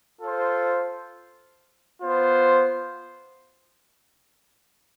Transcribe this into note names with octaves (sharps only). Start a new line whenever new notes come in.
F4 A4 C5
B3 F4 C5